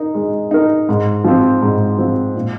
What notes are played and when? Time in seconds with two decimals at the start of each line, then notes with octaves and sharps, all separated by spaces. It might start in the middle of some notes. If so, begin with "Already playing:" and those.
Already playing: D#4 A#4
0.14 G#3
0.51 D#4 A#4
0.89 G#2
1.24 F3 C4
1.62 G#2
1.98 F3 C4
2.35 A#2